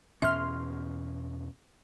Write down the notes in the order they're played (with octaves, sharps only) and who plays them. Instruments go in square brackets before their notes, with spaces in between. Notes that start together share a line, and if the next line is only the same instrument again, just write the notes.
[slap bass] E2 B2 C#4 [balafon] E5 [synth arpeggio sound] C6 F6